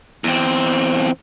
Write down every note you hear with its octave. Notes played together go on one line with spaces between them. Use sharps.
E2 C4